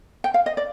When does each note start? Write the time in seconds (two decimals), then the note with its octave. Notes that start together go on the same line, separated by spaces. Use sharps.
0.24 G5
0.34 F5
0.46 D#5
0.57 D5